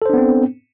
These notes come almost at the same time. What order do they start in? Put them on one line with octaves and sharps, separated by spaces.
A4 C5 D4 B3 C4